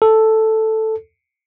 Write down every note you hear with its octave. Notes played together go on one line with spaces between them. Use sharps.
A4